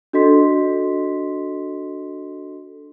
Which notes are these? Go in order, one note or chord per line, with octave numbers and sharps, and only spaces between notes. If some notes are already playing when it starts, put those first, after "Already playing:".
D4 F#4 A4 D#5 C6 B6